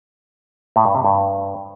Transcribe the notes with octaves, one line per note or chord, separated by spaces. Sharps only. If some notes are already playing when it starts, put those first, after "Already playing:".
A2
G2
C3
G2